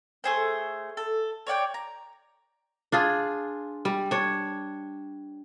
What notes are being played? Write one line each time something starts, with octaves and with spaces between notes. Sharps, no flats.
A3 G#4 C5
A4
C#5 D5 F#5 G5
A#5
D4 F4 G#4
G3
D4 C#5